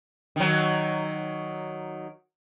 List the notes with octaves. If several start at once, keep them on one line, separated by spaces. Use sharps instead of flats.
D#3 F#3